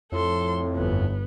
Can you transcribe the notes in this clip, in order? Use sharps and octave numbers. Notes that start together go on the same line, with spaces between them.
F2 A2 A4 C6
G1 B3